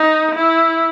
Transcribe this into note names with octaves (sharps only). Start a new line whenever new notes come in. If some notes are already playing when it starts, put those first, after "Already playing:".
Already playing: D#4
E4